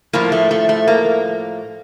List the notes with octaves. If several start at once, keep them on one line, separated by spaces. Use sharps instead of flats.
A2 F3 A#3
A3
A3
A3
A#3